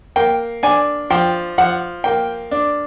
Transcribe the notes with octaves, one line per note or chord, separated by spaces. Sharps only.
A#3 G5
D4 G#5
F3 G5
F3 F#5
A#3 G5
D4